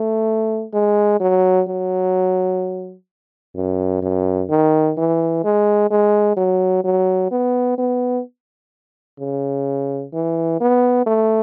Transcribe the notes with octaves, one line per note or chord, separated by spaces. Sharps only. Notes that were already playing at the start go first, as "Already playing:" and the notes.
Already playing: A3
G#3
F#3
F#3
F#2
F#2
D#3
E3
G#3
G#3
F#3
F#3
B3
B3
C#3
E3
B3
A3